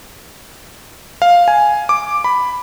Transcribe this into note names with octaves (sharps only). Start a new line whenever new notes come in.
F5
G#5
D6
B5